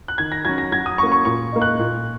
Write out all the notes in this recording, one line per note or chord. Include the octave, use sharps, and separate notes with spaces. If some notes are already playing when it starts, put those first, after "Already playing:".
F#6
D#3 G#6
A#6
F#3 C#4 G#6
A#6
F#3 G#6
D#6
A#3 C#4 C#6
C#6
A#2 C#6
A#3 D#4
F#6
A#2